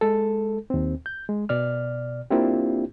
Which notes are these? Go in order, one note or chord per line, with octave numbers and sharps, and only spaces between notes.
G#3 A4
D#2 C4
G6
G#3
B2 D5 F6
A#3 C4 D4 E4 F4 G4